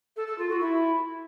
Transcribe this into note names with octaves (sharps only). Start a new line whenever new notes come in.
A4
A4
F4
F#4
E4